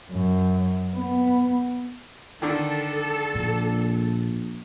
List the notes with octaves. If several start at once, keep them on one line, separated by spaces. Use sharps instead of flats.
F#2
B3
D3 D#3 A4
A#1 A#2